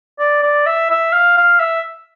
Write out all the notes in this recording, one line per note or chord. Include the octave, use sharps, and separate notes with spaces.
D5
D5
E5
E5
F5
F5
E5